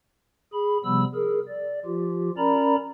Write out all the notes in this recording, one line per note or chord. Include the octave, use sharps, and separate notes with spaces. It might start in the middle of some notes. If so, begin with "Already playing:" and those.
G#4 B5
C3 F3 G3 B3 B5 E6
G#4 A#4
D5
F3 F4 G4
C#4 A#4 D5 A#5 B5